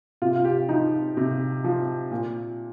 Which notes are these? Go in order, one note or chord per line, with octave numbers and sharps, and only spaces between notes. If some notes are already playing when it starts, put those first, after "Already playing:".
C3 F4
F4
G4
F3 D#4
C3
F3
A#2